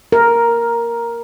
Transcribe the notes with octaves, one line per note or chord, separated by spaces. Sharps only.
A#4